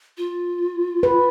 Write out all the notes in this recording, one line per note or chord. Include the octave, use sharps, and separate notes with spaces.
F4
B4